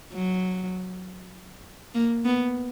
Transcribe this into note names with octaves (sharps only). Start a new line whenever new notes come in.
F#3
A#3
B3